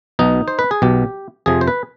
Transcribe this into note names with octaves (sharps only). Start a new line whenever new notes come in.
B1 B2 D#4
C5
B4
G#4
B1 B2 G4
F2 C3 F3 G#4
C5
B4